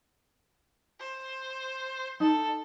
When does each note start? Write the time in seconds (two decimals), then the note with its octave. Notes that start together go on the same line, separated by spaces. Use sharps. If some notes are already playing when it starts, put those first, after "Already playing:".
1.00 C5
2.20 D#4 A4